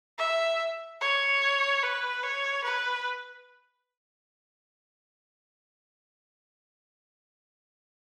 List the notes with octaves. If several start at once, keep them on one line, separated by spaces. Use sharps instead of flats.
E5
C#5
B4
C#5
B4